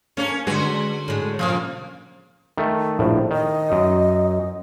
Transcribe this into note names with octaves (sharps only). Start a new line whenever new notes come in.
A#3 C#4 D4 A#4 C#5
D3 G#3 F#4 G#4 B4
A2 G#3
A#2 C#3 F3 A#3
D#3 A3
A#1 A2 C5
D#3 D#5
F#2